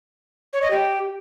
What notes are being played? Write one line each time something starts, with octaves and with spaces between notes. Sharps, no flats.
C#5
D#5
G4